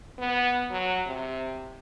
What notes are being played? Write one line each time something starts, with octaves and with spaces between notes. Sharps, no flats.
B3
F#3
C3